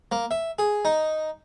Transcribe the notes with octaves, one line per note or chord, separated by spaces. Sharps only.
A#3
E5
G#4
D#4